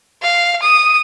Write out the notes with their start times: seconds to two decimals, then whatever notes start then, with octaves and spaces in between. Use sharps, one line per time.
0.23 F5
0.63 D#6